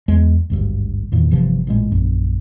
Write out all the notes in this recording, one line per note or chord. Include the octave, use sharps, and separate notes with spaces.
E2 G#3
G#1 D2 G2
E2 A#2 D#3
G1 C3 E3 F3
A1 A#2 G#3
A#1 F#2